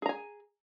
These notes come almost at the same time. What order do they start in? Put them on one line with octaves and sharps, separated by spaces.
G#4 A#5 G#5